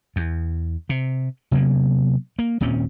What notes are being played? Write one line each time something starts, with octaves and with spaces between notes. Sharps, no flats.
E2
C3
C3 F#3 A#3 B3
A#3
D#1 A#2 C4 C#4